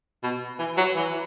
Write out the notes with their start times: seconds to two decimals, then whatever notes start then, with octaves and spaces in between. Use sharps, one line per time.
0.23 B2
0.59 E3
0.78 F#3
0.95 E3